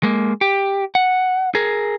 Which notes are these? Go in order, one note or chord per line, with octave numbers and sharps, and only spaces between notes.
G#3 A#3
G4
F#5
G#4 A#4